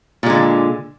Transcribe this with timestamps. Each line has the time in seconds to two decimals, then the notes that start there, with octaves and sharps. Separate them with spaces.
0.23 A#2
0.26 G#3
0.30 D3